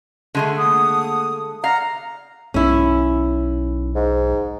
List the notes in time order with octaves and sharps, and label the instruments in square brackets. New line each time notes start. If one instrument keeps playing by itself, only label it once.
[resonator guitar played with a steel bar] D3 G#3 A3
[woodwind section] A#3 F#5 D#6
[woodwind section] D5 F#5 A#5 [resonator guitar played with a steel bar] F5
[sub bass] B1 [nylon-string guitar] C#4 E4
[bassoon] G#2